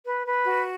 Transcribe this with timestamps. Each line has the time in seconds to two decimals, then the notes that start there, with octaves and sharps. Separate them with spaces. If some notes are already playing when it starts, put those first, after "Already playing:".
0.06 B4
0.27 B4
0.46 F#4